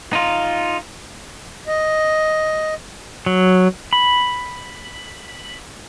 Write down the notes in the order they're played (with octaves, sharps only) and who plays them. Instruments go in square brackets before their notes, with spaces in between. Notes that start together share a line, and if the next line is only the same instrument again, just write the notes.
[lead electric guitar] D#4 F4
[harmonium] D#5
[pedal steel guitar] F#3
B5